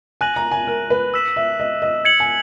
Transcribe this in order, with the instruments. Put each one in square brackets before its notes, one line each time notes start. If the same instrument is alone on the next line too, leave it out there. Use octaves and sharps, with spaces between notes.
[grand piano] G#5 [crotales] F#6 A#6 D#7 F#7
[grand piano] A#5
G#5
A#4
B4
[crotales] E6 B6 E7
[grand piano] E5
D#5
D#5
[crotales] G#6 C#7 F#7
[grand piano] G#5